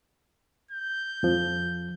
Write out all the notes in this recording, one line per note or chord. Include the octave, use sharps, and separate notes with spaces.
G6
F2 F3